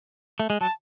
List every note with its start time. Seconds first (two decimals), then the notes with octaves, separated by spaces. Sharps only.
0.40 A3
0.50 G#3
0.61 F#3 A5